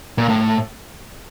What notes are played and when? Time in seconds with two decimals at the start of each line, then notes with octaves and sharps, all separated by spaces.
0.18 A#2
0.29 A2